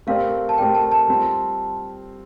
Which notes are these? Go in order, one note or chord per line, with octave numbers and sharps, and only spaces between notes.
A3 C4 G4 A#4 D5 F5
A5
A3 C4 G4 A#4 D5 G5
A5
A5
G3 C4 F4